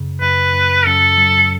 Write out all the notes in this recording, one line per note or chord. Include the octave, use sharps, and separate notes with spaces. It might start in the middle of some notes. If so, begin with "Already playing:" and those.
Already playing: F#2 C#3
F#2 B4
F#2
F#2 A4
F#3